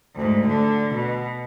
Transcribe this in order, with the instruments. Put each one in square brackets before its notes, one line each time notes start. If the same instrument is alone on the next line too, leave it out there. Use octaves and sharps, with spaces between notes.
[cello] D2 G#2
D3
B2